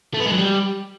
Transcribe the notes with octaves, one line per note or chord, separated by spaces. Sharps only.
A3
B3
G#3
F#3
G3